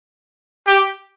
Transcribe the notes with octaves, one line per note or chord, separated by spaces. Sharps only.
G4